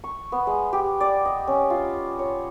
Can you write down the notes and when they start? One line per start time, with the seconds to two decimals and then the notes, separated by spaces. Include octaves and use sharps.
0.04 C#6
0.32 B3
0.47 G#3
0.73 G4
1.00 D5
1.25 D#5
1.47 C#4
1.70 F4
2.19 C#5